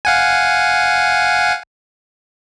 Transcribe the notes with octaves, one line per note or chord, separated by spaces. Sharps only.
F5 F#5 G#5